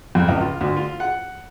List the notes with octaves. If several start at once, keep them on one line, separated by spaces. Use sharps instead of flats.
F2
C#2
F4
D2
F4
F#5